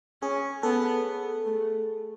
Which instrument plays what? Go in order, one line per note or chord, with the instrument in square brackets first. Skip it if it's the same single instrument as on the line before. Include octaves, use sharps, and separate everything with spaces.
[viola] C#4 [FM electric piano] G#4
[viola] B3 [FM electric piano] A4
[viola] A3